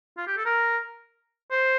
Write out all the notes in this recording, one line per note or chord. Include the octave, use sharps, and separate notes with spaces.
F4
G4
A4
A#4
C5